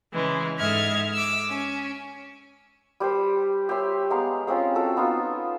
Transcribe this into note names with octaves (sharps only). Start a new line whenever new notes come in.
C#3 E3 G#3
G#2 A4 E5 D#6 F6 G#6
D6 E6
C#4
G3 G4 B4 C5
G4 C#5 E5 C6
G#3 B3 F5 A#5
G#3 C4 C#4 F4
F#4 A4 G5
B3 D#4 F4